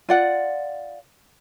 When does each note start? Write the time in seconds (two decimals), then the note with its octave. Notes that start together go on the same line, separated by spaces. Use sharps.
0.09 F4 D5 F#5